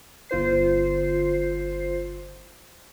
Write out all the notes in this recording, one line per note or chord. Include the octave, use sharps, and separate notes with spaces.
G1 F4 C5 C7